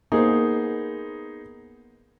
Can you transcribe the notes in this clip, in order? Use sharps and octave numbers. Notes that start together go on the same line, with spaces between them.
A#3 B3 D#4 G#4 C5